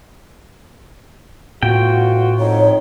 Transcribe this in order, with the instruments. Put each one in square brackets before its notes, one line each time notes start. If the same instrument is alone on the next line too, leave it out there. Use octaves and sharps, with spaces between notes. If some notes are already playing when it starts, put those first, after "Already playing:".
[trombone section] A1 F4 F#4 [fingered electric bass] A2 B3 [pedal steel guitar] G5
[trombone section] F2 D#4 [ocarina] C#5